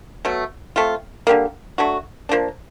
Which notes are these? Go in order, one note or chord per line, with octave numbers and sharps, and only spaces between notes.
B2 F#3 A3
A3 C4 F4
D3 G3 A#3
F#3 A3 D4 F#4
F3 A#3 D4